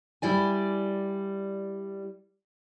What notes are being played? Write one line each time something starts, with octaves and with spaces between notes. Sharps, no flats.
G3 E4 D5 G#5